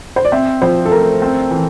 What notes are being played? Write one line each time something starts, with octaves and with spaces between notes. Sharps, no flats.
C5
D5
C4 E5
F3 C5
A4
A3 A#4
C4
E3